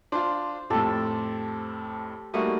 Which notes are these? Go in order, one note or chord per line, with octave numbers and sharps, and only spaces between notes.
D4 F4 C5
F2 A2 G4 A4
G3 A3 A#3 D#4 F#4 D#6